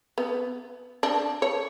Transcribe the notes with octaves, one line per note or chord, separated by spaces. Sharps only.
B3
D4
C#5